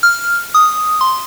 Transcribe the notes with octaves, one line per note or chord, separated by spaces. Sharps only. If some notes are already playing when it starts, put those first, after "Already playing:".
F6
D#6
C6